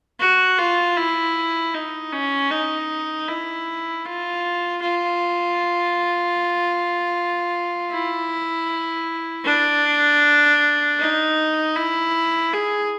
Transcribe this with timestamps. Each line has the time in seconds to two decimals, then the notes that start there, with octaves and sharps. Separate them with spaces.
0.20 F#4
0.59 F4
0.97 E4
1.74 D#4
2.13 C#4
2.51 D#4
3.28 E4
4.05 F4
4.82 F4
7.91 E4
9.45 D4
11.00 D#4
11.76 E4
12.53 G#4